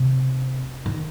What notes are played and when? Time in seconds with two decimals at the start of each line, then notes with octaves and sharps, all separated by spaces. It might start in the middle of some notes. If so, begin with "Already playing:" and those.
Already playing: C3
0.86 D#3